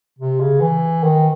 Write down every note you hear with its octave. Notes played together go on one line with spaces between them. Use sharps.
C3
C#3
E3
D#3